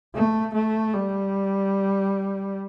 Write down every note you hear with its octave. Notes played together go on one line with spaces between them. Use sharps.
A3
A3
G3